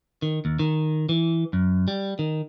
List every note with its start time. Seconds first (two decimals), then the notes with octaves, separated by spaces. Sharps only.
0.22 D#3
0.45 D#2
0.59 D#3
1.09 E3
1.53 F#2
1.88 G3
2.19 D#3